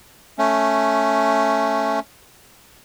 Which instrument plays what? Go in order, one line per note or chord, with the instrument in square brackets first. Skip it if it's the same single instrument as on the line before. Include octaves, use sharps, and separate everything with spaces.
[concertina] A3 C#4